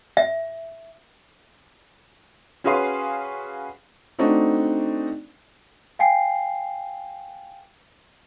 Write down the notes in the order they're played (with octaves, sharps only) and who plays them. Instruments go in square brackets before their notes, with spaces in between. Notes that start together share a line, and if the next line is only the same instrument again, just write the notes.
[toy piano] E5
[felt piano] C#4 F#4 G#4 B4 F5 C6
A3 C4 D4 D#4 F#4
[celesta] F5 G5 G#5 C7